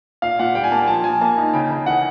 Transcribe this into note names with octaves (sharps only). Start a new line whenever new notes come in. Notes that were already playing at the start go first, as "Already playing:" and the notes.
A#2 F5
A#2 F#5
G3 G5
G#5
A#3 A5
F3 A5
F3 G#5
A#3 A5
D#4
C#3 G5
C#3
E3 F#5